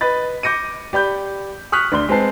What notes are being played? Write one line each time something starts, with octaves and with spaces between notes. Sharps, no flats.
B4 D#5 B5 A6
D6 G6 A#6 C#7 D#7
G4 D5 B5 G6
C#6 D#6 F6 F#6 B6
D2 D5 C6 G7
G#3 C4 B4 A5 C7